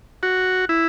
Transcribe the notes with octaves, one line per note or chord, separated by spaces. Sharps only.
F#4
E4